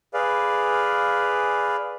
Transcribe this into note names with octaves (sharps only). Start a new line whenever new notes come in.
G#4 B4 D5 F5